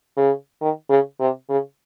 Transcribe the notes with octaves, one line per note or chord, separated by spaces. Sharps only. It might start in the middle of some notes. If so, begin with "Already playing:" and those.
C#3
D#3
C#3
C3
C#3